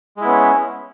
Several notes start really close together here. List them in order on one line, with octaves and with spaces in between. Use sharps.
G#3 E4 B3 C#4